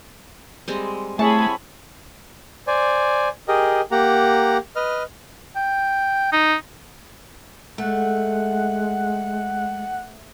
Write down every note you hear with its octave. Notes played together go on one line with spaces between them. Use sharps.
G3 G#3 C4
A3 C4 E4 G#4 C#5 A5 B5
C5 D5 G#5
G4 G#4 A#4 D#5
A#3 G4 F#5 A#5
B4 D#5 F6
G5
D#4
G#3 A3 F#5